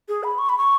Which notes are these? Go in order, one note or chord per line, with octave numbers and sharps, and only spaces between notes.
G#4
B5
C#6
B5
C#6